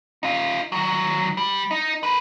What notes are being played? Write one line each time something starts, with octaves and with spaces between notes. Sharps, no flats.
D#4 F4
D#3 F#3
G3
D#4
A#4 B4